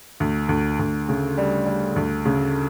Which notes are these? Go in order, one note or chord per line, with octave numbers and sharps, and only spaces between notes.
D2
D2
D2
C#3
G3
G3
D2
C#3